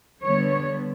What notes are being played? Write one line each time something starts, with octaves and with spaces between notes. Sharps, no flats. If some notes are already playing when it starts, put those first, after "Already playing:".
D3 G3 B3 C#5